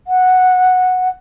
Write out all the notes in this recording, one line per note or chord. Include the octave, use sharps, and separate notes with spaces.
F#5